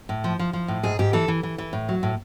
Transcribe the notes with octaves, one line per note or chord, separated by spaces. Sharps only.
A2
F3
F3
F3
A2
G#2 G#4
G#2 G4
E3 A4
E3
E3
E3
A2
F#3
A2